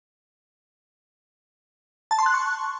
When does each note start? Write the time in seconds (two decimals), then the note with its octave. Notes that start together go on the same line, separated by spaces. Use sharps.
2.11 A5
2.19 C6
2.26 F#6
2.34 C#6